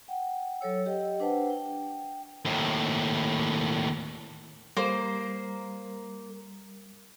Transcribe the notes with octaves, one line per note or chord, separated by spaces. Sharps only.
F#5 G5
F#3 A4 C#5 E6
G4 D#5 G5
D4 B4 C5 F#5 G5 A5
G5
D#2 A2
G3 A#3 C5